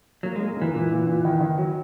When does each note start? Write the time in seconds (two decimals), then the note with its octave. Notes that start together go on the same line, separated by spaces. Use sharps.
0.23 F#3 A#3
0.36 G#3
0.40 A#3
0.57 E3 A#3
0.73 A#2 E3
0.91 A#2
1.07 A#2
1.25 D#3
1.41 D#3
1.58 F#3